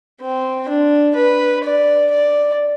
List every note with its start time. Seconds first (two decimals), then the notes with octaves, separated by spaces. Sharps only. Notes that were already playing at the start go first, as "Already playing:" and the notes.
0.21 C4
0.68 D4
1.15 B4
1.64 D5
2.11 D5